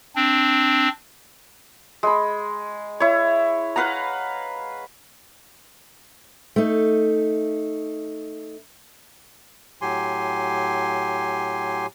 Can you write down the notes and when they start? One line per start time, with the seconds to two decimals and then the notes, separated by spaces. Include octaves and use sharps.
0.15 C4 D4
2.03 G#3 B5
3.00 E4 C#5
3.76 B4 F5 F#5 A#5
6.56 A3 D#4
9.82 A2 F#3 G4 G#5 C6